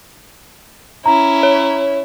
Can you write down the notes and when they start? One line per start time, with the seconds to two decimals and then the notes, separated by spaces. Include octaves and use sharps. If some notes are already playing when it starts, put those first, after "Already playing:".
1.06 C#4 E4 A#5
1.43 C#5